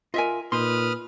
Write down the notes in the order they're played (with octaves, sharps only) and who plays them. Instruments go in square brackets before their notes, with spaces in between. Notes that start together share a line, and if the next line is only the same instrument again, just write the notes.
[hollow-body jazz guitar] F4 A#4 [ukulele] D#5 E5 G#5
[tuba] A#2 [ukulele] D#4 [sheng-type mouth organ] B4 D#6 F6 [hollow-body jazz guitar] C6